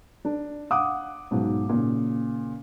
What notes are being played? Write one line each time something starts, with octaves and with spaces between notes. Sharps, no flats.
D4
F5 F#5 D6 D#6
B1 G#2
A#2 C#3